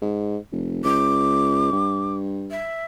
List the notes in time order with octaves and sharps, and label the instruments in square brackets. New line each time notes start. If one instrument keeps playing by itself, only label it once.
[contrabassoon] G#2
F1
[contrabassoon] C#2 [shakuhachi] D6
[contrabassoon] G2
[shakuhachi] E5